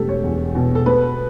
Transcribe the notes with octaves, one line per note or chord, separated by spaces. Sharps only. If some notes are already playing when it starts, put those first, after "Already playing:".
Already playing: E1 A3 G4 A4
C#5
E2
B2
A4
B3 B4